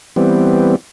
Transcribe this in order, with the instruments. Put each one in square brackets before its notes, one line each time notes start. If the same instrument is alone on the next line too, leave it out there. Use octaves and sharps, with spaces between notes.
[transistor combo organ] E3 G3 B3 C4